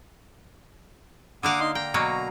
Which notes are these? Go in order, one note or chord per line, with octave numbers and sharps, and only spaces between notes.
D3 A#3 F5 F#5 D6 D#6
D#4 C6
G5 A#5
B2 F#3 A#3